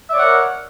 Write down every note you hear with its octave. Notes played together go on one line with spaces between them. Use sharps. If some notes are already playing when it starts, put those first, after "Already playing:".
A#4 C#5 D5 E5 F#5